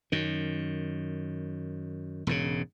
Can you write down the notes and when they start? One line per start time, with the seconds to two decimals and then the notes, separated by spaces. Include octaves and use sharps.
0.12 F#2 D#3
2.27 E1 G#2 C#3